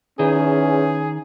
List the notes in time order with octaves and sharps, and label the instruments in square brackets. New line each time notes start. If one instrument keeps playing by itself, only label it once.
[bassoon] E2 [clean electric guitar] D#3 [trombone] C#4 [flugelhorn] G#4